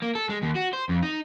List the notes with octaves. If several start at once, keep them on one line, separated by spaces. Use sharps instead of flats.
A#3
A4
G#3
D#2
F#4
C5
F2
D#4